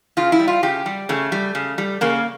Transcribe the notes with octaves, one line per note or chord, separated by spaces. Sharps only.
C#3 F4
E4
G3
F4
C#3 G4
G3
C#3 A3
G3
C#3
G3
C#3 A#3